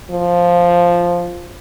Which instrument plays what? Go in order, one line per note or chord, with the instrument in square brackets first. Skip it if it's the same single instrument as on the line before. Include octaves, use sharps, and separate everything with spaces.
[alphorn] F3